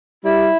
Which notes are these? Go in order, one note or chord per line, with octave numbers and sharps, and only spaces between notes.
G3 E4